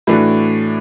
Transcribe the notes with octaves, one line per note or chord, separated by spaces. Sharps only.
A2 E3 A3 D4 F#4